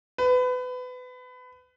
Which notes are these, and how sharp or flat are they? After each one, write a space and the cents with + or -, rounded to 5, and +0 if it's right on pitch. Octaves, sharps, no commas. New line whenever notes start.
B4 +25